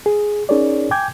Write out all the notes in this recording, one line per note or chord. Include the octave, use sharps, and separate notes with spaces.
G#4
C#4 D#4 G#4 A#4 C#5 D5
G5 G#5 D6 G6 G#6